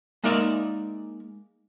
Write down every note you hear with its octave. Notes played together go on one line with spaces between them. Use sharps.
G#3 A#3 D#4 A#4 D5 E5